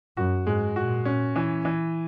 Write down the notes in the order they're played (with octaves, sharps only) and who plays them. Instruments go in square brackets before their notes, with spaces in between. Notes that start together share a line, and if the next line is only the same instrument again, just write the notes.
[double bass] F#2 [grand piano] F#4
[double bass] G#2 [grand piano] G#3
[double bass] A#2 [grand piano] F#4
[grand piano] C#4
E3
E3